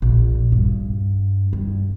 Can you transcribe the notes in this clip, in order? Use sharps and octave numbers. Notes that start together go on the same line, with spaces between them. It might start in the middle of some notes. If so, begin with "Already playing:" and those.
A#1
G2
G2